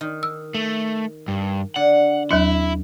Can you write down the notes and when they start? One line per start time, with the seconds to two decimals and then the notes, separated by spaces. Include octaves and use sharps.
0.01 D#3
0.23 E6
0.55 A3
1.28 G2
1.76 D3 F#5
2.31 D#2 F#3 D4 E4